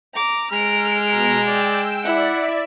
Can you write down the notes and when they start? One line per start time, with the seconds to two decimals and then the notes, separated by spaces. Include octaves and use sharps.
0.15 A#5 D6
0.52 G#3 A#5 F6 D7
1.12 B2 A#5
1.47 D5 G5 E6
2.04 E4 D5 E5 F#5